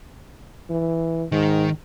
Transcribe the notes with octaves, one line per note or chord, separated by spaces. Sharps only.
E3
G#2 D#3